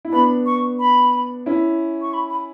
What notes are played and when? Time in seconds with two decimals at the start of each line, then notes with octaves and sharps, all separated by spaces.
0.05 E4
0.12 B3 D4 B5
0.46 C#6
0.79 B5
1.46 C#4 E4
2.02 C#6
2.14 B5
2.30 B5